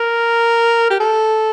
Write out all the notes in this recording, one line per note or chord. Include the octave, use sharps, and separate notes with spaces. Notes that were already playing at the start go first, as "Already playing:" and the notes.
Already playing: A#4
G4
A4